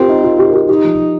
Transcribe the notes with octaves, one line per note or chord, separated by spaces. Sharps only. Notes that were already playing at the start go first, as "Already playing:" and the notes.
Already playing: C4 F4 G4 A#4
D#4
F4
G4
A#4
G4
D#4 G4
F3